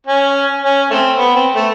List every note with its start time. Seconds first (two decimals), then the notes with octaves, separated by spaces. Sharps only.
0.06 C#4
0.63 C#4
0.91 A3 C4
1.18 B3
1.35 C4
1.55 A3